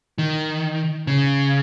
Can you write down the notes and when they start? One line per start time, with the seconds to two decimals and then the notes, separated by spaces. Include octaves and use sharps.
0.18 D#3
1.07 C#3